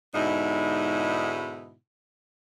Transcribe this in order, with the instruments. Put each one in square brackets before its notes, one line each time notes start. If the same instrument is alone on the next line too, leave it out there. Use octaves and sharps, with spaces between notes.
[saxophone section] G#2 B2 D3 G#3 D#4 E4